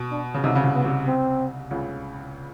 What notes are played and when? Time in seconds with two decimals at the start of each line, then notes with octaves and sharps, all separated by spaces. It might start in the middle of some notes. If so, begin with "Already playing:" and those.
Already playing: B2
0.11 D4
0.34 C#3
0.44 C2 C3 D#4
0.55 C#3
0.64 C2 C3
0.75 B3
0.85 C2 C3
1.07 C4
1.71 C#2 C#3